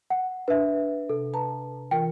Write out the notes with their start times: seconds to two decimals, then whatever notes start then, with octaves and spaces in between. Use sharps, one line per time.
0.10 F#5
0.48 D4 B4 E5
1.09 C3 A4
1.34 B4 A5 A#5
1.91 E3 F4 A#4 G5